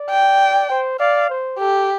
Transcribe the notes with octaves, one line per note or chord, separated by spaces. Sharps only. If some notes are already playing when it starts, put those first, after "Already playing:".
Already playing: D5
G5
C5
D5 F5
C5
G4 A4